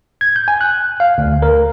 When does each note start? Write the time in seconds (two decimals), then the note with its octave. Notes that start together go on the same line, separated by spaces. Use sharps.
0.21 G#6
0.36 G6
0.48 G#5
0.61 F#6
1.00 F5
1.18 D2
1.42 A#4